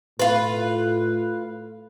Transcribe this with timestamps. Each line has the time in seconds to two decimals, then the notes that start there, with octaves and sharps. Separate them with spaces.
0.19 A2 F4 B4